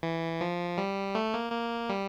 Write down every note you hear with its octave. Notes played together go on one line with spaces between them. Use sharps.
E3
F3
G3
A3
A#3
A#3
G3